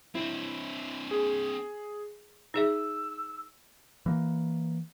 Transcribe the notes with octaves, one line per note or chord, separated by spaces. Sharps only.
C4 D4 E4
G#4
D#4 G#4 E5 E6
E3 A#3